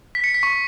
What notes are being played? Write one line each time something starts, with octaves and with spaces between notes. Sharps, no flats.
B6
C#7
B6
C#6